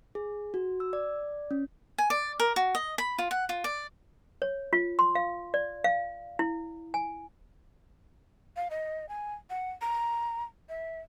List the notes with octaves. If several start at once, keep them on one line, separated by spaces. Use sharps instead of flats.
G#4
F#4
E6
D5
C#4
G#5
D5
A#4
F#4
D#5
B5
F4
F#5
F4
D5
C#5
F4
C6
F5
D5
F5
E4
G#5
F5
D#5
G#5
F#5
A#5
E5